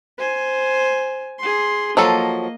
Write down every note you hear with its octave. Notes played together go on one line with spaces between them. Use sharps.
C5 G#5
G#4 C6
F3 F#3 A#3 A4 D#5